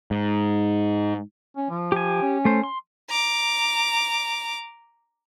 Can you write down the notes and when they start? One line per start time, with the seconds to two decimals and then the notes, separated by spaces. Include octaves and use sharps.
0.11 G#2
1.57 C#4
1.70 F3
1.92 G4 G#5
2.22 C#4
2.45 A3 C5
2.63 C6
3.10 A#5 D6